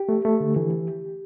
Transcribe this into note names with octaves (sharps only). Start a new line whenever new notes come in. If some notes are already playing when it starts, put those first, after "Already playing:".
Already playing: G4
A3
A3
D3
E3